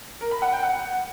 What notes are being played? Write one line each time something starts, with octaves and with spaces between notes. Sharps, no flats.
A#4
B5
F#5
G5
F#5